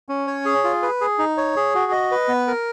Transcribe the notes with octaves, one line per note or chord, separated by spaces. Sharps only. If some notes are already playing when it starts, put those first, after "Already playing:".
C#4
C#5
G#4
F4
B4
G#4
D#4
C#5
G#4
F#4
D#5
B4
B3
A#4